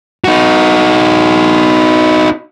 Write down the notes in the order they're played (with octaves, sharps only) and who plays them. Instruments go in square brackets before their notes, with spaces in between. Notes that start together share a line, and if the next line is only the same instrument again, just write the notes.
[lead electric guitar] D#4 F#4